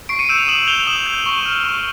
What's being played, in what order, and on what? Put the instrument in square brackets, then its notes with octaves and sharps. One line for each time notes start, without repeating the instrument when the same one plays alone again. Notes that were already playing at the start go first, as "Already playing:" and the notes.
[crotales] C#6 C7 D7
C#7 D#7
E6 G6 D7 E7
D#7 F7
D#6 E7 F#7
G6 F7 G7
D#6 E7 F#7
G6
C#6
F6
C#6